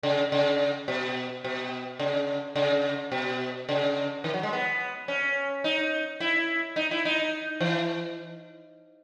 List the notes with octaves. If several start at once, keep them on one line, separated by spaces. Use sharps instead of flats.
C#3
C#3
B2
B2
C#3
C#3
B2
C#3
D#3
F#3
G#3
B3
C#4
D#4
E4
D#4
E4
D#4
E3